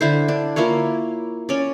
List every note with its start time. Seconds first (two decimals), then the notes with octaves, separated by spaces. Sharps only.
0.01 D3 E4 C5
0.28 D4
0.56 A#3 E4 F4 C#5
1.49 C#4 D5